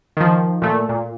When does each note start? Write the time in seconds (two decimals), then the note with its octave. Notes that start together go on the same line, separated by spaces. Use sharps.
0.17 D#3 F3
0.62 A#2 A3
0.89 A#2